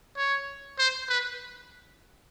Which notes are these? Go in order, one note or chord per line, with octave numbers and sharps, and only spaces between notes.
C#5
C5
B4